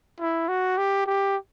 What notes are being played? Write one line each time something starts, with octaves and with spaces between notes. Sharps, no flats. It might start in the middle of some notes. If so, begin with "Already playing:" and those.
E4
F#4
G4
G4